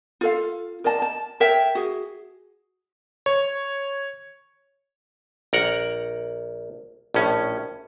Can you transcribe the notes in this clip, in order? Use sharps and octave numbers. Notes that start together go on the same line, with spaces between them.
F4 A4 F5
A#4 D5 D#5 A5
A5
A#4 C#5 E5 G5
F#4 G#4
C#5
A#1 A#4 F#5
A#1 A2 C#4